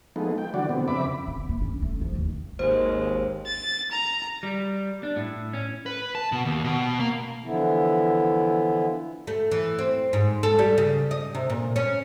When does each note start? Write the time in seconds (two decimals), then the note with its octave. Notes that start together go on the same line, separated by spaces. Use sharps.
0.16 F3 G#3 A3 B3 D#4
0.38 G5
0.54 D3 E3 F#3 G3 F#4 D5
0.69 B2 D3 B3 C4
0.88 F2 C#3 C4 E5 B5 D6
1.27 F2
1.49 A#3
1.62 C#4
1.82 A3
2.01 F3
2.15 D#2
2.59 G#1 D#2 G#3 C5
3.47 A6
3.92 A#5
4.43 G3
5.03 D4
5.16 A2
5.53 C#4
5.86 B4
6.15 A5
6.32 B2
6.45 D#2
6.64 B2
7.00 A#3
7.44 D3 E3 F3 B3 E4
9.27 A3
9.51 E3
9.79 C4
10.13 G#2
10.43 A4
10.59 G3
10.78 C#3
11.11 D#5
11.35 C3
11.50 A#2
11.76 C#4